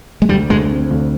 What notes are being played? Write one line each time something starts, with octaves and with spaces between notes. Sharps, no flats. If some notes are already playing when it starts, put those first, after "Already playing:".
G#3
D2 G3
D2 G#3
C4
D2